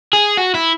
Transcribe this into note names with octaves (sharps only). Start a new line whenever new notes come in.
G#4
F#4
E4